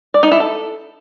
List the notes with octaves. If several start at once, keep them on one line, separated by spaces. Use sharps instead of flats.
D5
D#4
E4
A4